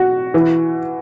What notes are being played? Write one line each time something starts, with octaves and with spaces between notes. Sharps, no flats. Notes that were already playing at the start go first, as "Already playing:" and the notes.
Already playing: F#4
E3